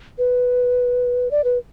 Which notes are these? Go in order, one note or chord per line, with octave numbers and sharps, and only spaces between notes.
B4
D5
B4